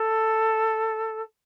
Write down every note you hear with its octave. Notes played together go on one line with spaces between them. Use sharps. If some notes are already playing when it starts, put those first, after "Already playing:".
Already playing: A4